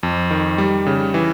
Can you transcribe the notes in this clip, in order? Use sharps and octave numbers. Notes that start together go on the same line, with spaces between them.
F2
D#3
G3
C#3
E3